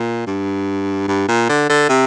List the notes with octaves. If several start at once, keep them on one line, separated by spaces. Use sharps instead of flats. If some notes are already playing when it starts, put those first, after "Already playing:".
Already playing: A#2
G2
G2
A#2
D3
D3
C3